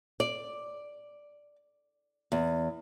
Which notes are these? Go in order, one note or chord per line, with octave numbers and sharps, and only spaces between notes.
D5
E2